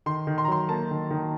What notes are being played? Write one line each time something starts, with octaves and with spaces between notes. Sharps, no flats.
D#3 C6
D#3
C6
A#5
F#3 C6
A#3 A5
D#3
D#3